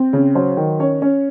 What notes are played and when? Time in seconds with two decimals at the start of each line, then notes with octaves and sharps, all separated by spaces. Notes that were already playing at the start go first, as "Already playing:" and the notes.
Already playing: C4
0.13 C#3
0.35 F#3 C5
0.57 D#3
0.79 C#4 C#5
1.02 C#4